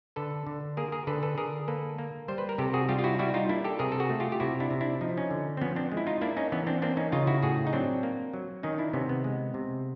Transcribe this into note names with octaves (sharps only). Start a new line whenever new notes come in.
D3 A4 B4
D3
A#3 G#4 A#4
G#4 A#4
D3 A4 B4
A4 B4
D3 G#4 A#4
A#3 A4 B4
A#3
G3 C5
B4
A#4
C3 G4 A4
F#4 G#4
G3 F4 G4
F4
E4 F#4
G3 E4 F#4
D#4 F4
A#3 D4 E4
G4 A4
C3 G#4 A#4
A4
F#4 G#4
A3
F4 G4
G4
C3 E4 F#4
D4 E4
C3
D4 E4
F3 D#4
E4
C#4 D#4
D3
C4
F3 B3 C#4
C4 D4
G#3
E4
D#4 F4
A#3 D4 E4
C#4 D#4
E3 B3 C#4
C4 D4
A#3 C4 D4
C#4 D#4
C#3 D#4 F4
E4 F#4
A2 F#4 G#4
D#4
F#3 C4 D4
A#3
F#3
D#3 C#4 D#4
D4 E4
C3 B3 C#4
B3
G#3
C3